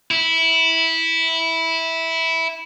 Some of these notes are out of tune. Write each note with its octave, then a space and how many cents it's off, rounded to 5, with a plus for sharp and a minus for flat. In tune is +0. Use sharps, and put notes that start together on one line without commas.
E4 -10